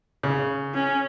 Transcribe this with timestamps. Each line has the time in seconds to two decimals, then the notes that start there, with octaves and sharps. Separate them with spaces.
0.23 C#3
0.74 C#4